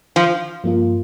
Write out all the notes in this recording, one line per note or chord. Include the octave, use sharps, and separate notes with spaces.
F3
G2 F3 A#3 F4